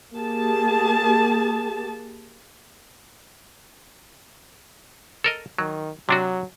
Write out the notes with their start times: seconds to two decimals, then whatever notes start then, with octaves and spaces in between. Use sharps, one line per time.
0.14 A#3 G4 G#4 A5
5.24 A4 A#4 D#5
5.59 D#3 F#3
6.09 C3 F#3 D4 F#4